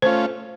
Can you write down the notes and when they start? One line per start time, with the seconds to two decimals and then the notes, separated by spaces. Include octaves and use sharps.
0.02 A3 C#4 F4 C5